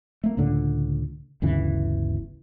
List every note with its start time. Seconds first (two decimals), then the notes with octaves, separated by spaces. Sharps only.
0.24 A3 A#3
0.37 C#2 A2 D3
1.42 G1 D2 C#3 E3